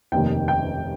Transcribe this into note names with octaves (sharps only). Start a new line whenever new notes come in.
F1 D#2 D#3 G5
G5